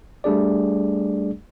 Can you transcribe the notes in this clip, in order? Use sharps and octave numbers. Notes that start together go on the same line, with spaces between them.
G3 A3 D4 G#4 D5